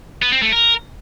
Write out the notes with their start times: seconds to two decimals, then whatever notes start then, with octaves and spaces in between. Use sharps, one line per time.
0.22 B3
0.32 C4
0.42 A3
0.53 A#4